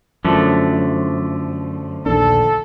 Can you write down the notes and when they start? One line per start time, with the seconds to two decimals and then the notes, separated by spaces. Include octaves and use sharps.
0.25 F#2 D3 F3 A3
2.06 A#1 D#2 D4 A4